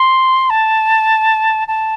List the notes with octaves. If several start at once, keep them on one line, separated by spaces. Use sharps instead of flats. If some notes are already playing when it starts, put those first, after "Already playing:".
Already playing: C6
A5
A5